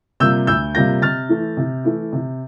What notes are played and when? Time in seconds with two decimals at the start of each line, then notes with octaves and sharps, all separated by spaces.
0.20 C3 G3 A#3 F4 E6 G6
0.47 D2 E6 G6
0.75 C3 G3 A#3 F4 G6 A#6
1.02 C3 F6 A6
1.29 E3 A3 E4
1.57 C3
1.84 E3 A3 E4
2.13 C3